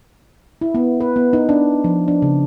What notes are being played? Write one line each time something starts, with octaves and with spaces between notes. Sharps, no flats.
E4
B3
B4
B3
D#4
D4
F3
D4
C#3